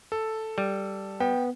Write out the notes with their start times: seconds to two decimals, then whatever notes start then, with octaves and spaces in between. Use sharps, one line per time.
0.12 A4
0.58 G3
1.20 B3 G5